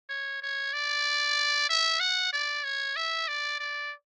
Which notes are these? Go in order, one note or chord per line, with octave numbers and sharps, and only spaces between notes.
C#5
C#5
D5
E5
F#5
D5
C#5
E5
D5
D5